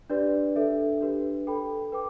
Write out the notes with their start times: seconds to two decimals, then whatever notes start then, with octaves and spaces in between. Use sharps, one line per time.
0.10 D4 G4 B4 D5
0.56 D4 A4 E5
1.01 D4 G4 B4
1.47 A4 G5 B5
1.92 B4 G5 D6